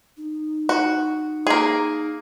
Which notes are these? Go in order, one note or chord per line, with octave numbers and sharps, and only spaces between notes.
D#4
F#4
A#3 G#4